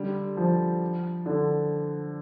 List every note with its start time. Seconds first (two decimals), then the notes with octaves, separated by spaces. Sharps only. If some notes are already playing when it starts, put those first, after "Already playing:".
Already playing: D3 G3
0.37 F3
1.26 D3